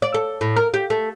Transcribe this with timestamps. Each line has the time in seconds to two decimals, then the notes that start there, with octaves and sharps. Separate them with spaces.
0.02 D5
0.14 A4
0.41 A2
0.56 A#4
0.74 G4
0.90 A3